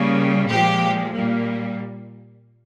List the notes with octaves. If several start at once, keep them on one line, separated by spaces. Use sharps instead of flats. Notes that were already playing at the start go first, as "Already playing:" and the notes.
Already playing: C#3 G3 A#3
A#2 F3 G#3 G4
A#2 G3 A#3